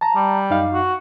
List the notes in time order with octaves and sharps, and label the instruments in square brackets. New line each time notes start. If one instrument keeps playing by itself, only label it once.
[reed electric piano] A5 A#5
[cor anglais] G3
[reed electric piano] F#2 D#4 F5
[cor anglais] F#4